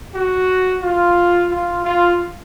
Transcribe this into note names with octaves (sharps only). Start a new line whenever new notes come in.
F#4
F4
F4
F4